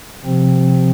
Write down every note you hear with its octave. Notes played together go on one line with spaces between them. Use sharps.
C3 F3 C4